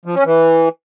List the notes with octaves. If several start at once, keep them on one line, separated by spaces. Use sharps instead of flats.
F3
C#4
E3